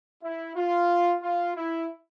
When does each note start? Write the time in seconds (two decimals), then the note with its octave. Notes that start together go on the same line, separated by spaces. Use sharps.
0.23 E4
0.56 F4
1.22 F4
1.56 E4